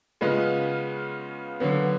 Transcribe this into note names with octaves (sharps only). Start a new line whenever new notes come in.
C#3 G#3 B3 F4 B4
D3 F#3 B3